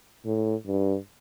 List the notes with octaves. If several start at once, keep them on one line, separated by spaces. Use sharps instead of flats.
A2
G2